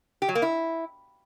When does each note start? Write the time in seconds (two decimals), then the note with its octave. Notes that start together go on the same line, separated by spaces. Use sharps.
0.22 G4
0.29 F#3
0.35 A#3
0.42 E4